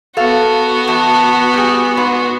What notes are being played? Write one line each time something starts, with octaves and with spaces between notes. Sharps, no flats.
B3 F#4 A4 F5
E2 A5
G3 G#4
G#2 B4